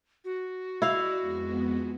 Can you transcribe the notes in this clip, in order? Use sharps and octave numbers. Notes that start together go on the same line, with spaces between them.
F#4
E4 D5 F5
F2 G#3 B3